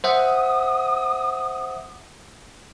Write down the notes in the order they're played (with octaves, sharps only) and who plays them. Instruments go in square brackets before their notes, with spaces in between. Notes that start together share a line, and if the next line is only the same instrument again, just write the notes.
[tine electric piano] C5 E5 F#5 [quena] D#6